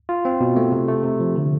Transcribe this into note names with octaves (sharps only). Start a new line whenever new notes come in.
F4
C4
B2
A3
C3
A3
C3
F3
D3